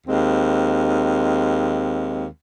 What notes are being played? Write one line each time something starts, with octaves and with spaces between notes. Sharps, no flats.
D#2 G#3 C4